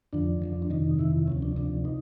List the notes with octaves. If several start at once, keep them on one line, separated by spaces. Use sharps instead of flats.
F2 D3 F3 D4
F2 D3 F3
D4
F2 C3 D#3 D#4
F2 C3 D#3 E4
D2 C3 F3 C#4
D4
D2 C3 F3 D4
D#4